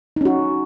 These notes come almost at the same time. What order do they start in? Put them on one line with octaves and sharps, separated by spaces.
D#4 C#4 F#4